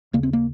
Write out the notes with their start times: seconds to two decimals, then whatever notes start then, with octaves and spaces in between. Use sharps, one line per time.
0.13 D#2 C#3 A#3
0.23 C4
0.33 A#3